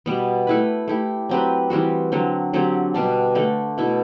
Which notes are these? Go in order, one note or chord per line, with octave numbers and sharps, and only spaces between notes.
B2 G3 B3
A3 E4 B4
A3 E4 G4
F#3 C4 G4 B4
E3 G3 C4 F#4
D3 F#3 C4
D3 F#3 C4 G4
B2 G3 D4
D3 A3 D4
B2 A3 E4